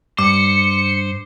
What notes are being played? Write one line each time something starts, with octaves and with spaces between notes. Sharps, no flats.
G2 C5 D6 C#7